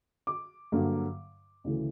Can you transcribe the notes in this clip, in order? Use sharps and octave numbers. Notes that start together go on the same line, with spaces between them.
D6
G2 D3 F#3 A#3
D2 C#3 E3 A3